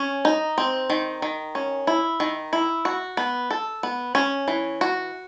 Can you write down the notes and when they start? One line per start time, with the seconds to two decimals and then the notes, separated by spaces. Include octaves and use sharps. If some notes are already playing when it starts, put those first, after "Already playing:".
Already playing: C#4
0.25 D#4
0.58 C4
0.90 D#3
1.22 D#3
1.55 C#4
1.87 E4
2.20 D#3
2.53 E4
2.85 F#4
3.17 B3
3.51 A4
3.83 B3
4.15 C#4
4.48 E3
4.81 F#4